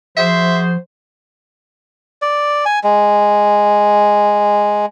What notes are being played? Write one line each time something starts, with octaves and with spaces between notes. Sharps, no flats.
F3 F#4 G#4 C5 E5
D5
G#5
G#3